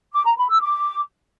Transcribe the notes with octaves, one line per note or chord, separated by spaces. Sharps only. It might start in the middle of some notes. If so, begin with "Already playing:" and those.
D6
A#5
B5
E6
D6